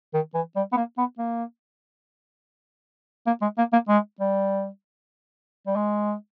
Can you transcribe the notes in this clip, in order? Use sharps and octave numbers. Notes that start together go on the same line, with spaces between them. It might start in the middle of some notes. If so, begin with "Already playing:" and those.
D#3
E3
G3
B3
A#3
B3
A#3
A#3
G#3
A#3
A#3
G#3
G3
G3
G#3